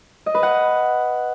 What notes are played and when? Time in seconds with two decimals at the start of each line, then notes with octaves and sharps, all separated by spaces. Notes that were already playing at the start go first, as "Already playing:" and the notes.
0.26 D#5
0.35 B4
0.43 F#5